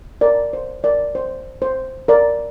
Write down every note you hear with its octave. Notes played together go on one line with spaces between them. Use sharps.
A#4 D5
C5
A#4 D5
C5
C5
A#4 D5